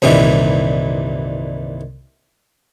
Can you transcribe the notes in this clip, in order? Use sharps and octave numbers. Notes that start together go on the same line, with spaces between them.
C2 G2 A#2 D#3 E3